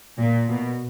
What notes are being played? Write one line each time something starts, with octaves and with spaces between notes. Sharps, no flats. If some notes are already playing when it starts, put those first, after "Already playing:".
A#2
B2